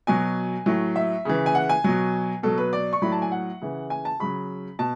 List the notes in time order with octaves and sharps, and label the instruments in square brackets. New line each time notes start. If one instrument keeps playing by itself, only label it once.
[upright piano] B2 F#3 G#5
A2 F#3
E5
C#3 E3
G#5
F#5
G#5
B2 F#3
B2 F#3 A4
B4
D5
C#6
A2 F#3 B5
A5
G#5
F#5
C#3 E3
G#5
A5
C#3 F#3 B5
B2 A5